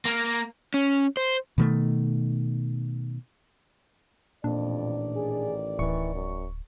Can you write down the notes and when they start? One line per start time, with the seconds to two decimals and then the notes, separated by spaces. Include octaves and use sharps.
0.05 A#3
0.74 C#4
1.17 C5
1.58 B2 D#3 A3
4.44 A1 F2 A#2 D#3 D4 D5
5.16 G#4
5.79 D1 E3 C#6
6.14 F#2